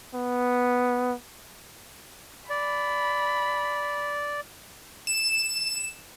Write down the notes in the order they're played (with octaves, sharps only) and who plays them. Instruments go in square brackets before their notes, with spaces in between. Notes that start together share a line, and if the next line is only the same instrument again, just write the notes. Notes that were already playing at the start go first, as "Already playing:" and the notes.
[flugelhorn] B3
[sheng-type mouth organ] D5 [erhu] B5
[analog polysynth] E7